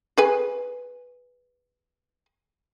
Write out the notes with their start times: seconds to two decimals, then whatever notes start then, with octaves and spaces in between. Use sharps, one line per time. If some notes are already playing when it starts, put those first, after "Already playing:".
0.18 G#4 B4 G#5